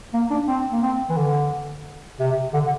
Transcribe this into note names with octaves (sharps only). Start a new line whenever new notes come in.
A#3
D4
C4
A#3
C4
E3
D3
C3
D3